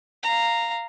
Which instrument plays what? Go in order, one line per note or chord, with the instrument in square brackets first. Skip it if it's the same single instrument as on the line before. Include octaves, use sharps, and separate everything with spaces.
[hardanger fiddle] F5 A#5